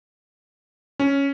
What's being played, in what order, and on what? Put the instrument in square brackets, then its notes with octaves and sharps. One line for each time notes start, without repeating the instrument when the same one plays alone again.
[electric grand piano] C#4